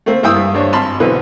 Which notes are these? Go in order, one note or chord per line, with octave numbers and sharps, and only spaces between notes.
A3 A#3 C4
G2 E4 E5 G5 D#6 E6
G2
G2 D4 C5 C#5
G#1 A5 B5 C6 F6
B1 D3 E3 C4 B4